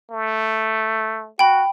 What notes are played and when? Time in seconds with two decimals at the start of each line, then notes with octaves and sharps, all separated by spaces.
0.12 A3
1.39 F#4 G5 B5